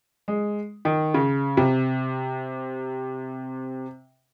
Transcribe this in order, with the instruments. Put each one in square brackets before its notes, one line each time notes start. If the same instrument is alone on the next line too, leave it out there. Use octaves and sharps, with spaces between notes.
[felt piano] G#3
D#3
C#3
C3